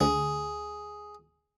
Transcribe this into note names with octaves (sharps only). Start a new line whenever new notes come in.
D2 G#4